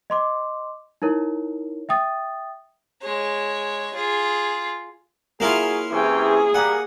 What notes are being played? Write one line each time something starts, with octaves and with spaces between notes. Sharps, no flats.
D#5 C6 D6
D#4 E4 A#4 C#5
E5 G5 D#6 A6
G#3 C#5
F4 G#4
F#3 A#3 E4 F4 G#4
C3 E3 C#4 G#4 G5
G#4
G3 A#3 F#5